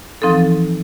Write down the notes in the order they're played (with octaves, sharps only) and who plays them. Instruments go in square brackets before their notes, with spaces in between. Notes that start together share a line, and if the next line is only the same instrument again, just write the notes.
[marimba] E3 F3 C4 D#4 A4